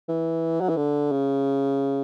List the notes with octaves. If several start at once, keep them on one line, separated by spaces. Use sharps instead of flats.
E3
F#3
E3
D3
C#3